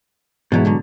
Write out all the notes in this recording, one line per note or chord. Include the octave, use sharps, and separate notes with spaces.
G#2 B2 E3 F#3 G#3 E4
B2 D3 F#3